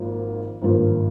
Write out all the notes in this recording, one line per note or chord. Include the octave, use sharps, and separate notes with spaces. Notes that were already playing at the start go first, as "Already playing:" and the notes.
Already playing: G#1 G#2 F3 A#3 F4
G#1 G2 F3 A#3